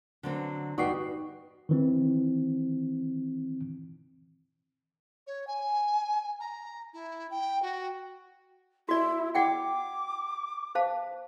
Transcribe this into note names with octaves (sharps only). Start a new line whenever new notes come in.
D3 F#3 C4
E2 G2 B3 D#4 F#4 G4 D5 C7
D#3 E3 C4
C#5
G#5
A#5
E4
G5
F#4
E4 F#4 D5
D5 F#5 G5 D6
C5 F5 A5